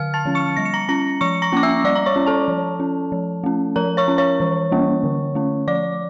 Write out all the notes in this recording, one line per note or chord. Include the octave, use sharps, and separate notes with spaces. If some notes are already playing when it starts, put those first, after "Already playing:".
Already playing: D3 F5 F6
A5 A6
F3 C#4
C#6 C#7
G3 A#6
C#7
A#5 A#6
C#4 A#5 A#6
F3 C#6 C#7
A#5 A#6
A#3 C#4 D6
E5 E6
G3 D5 D6
A#5
C#5 C#6
C#4
A4 A5
F3
C#4
F3
A3 C#4
F3 A#4 A#5
C#5 C#6
C#4
C#5 C#6
E3
G3 A#3 C#4
D3
A3 C#4
F3 D5 D6